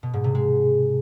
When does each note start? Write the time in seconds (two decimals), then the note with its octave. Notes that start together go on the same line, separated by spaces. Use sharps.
0.03 B2
0.14 G#2
0.24 C3
0.35 G#3